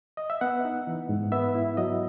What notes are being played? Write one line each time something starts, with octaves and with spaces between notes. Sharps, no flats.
D#5
E5
B3 F#5
D#4
E3
G#2
B3 E5
E4
F#3 D#5